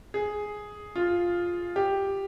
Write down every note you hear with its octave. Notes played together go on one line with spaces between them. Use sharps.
G#4
F4
G4